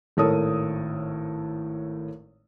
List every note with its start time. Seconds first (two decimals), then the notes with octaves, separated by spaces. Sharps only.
0.17 G#1 A2 A4 A#4 C#5 D#6